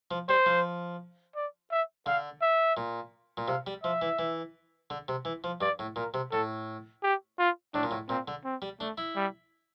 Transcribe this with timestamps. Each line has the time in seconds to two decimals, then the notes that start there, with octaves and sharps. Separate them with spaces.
0.11 F3
0.29 G3 C5
0.46 F3
1.36 D5
1.71 E5
2.06 D3 F5
2.42 E5
2.77 A#2
3.37 A#2
3.48 C3 F5
3.67 G3
3.83 F3 E5
4.02 E3
4.19 E3
4.90 D3
5.08 C3
5.25 E3
5.44 F3
5.61 G2 D5
5.79 A2
5.96 A#2 A#4
6.14 C3
6.32 A2 A4
7.03 G4
7.39 F4
7.74 A2 D4
7.83 A#2
7.91 A2
8.09 A#2 C4
8.28 D3
8.45 C4
8.62 G3
8.80 A3 D4
8.98 E4
9.16 G3